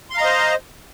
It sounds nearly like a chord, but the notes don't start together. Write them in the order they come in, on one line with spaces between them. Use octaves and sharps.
C6 F5 A#5 D#5 C5